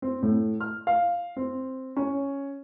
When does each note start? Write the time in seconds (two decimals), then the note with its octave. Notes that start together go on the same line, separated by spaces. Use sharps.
0.02 C4
0.23 A2
0.60 F6
0.87 F5
1.37 C4
1.97 C#4